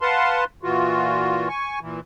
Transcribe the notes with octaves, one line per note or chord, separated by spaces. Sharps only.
B4 F5 F#5 A5 C6
A#2 E3 F4 F#4
G#5 C#6
A#2 E3